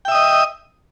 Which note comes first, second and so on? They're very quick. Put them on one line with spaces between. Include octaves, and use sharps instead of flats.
G5 E5 D#6 D#5